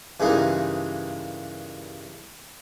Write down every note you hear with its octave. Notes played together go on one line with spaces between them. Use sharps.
G2 C#3 E3 G#3 A#3 D#4